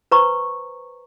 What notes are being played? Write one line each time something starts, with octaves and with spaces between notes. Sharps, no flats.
B4 C5 A#5 C#6